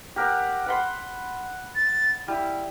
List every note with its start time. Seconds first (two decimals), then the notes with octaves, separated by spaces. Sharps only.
0.16 G4 A#4 F#5
0.66 F#5 B5 C6
1.75 A6
2.28 G3 E4